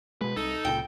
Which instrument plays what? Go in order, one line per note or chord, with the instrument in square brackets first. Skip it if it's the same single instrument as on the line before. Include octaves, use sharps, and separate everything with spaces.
[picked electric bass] B2 G#3 [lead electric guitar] B4
[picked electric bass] C2 [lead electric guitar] D#4 [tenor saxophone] A4
[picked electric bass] C#2 A#2 C#3 [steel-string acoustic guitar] G5